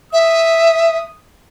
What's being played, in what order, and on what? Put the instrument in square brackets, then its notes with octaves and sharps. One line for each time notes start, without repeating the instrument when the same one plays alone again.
[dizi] E5 [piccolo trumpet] D#6